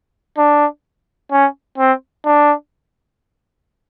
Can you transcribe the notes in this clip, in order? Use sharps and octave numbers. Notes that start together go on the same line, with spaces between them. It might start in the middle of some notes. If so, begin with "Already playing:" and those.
D4
C#4
C4
D4